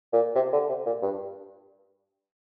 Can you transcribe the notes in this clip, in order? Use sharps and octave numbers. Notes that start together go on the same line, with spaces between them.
A#2
C3
D3
C3
A#2
G2